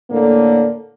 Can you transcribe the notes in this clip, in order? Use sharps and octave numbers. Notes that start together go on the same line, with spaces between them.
A2 D3 A#3